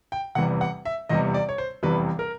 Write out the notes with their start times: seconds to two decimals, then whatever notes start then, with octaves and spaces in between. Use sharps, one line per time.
0.12 G5
0.35 F1 E2 C3 E3 G3 F#5
0.61 F#5
0.85 E5
1.09 F1 E2 C3 E3 G3 D#5
1.34 D5
1.49 C#5
1.58 C5
1.83 F1 E2 C3 E3 G3 B4
2.19 A#4